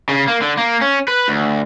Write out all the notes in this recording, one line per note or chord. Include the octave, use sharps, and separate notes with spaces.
C#3
A#3
D3
A#3
C#4
B4
D2